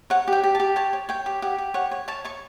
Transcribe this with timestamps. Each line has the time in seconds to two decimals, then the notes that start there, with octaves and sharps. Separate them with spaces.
0.10 C#5 F#5
0.28 G4 G5
0.44 G4
0.55 A5
0.60 G4
0.76 C#5 A5
0.93 C#5
1.09 C#5 G5
1.26 G4
1.42 G4 F#5
1.58 G4
1.74 C#5 F#5
1.91 C#5
2.08 C#5 A5
2.24 C#5 C#6